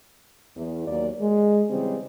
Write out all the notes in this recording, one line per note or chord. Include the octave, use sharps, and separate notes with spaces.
E2
D#2 F#3 A#3 D5
G#3
C#3 E3 G3 G#3 C4